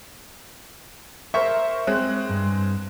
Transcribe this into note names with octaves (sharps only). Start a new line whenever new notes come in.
A#4 C5 E5 C#6
G#3 C4 F#6
G2